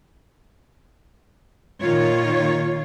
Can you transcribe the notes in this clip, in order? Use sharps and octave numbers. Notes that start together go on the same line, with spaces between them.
A#2 D#3 F4 C#5